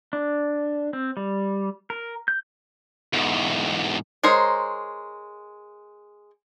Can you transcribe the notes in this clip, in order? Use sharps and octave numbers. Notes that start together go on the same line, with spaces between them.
D4
C4
G3
A#4
G6
E2 G#2
G#3 A#4 C5 C#5